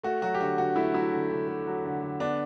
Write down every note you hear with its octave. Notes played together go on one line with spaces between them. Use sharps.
A3 F#4
F#3 F#4
G4
D3 F#4
D3 F#4
A3 E4
F#3 E4
D3
D3
A3
F#3
D3
D3
B3 D4